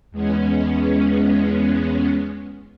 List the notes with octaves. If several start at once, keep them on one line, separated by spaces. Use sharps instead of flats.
E2 G#3 B3 C#4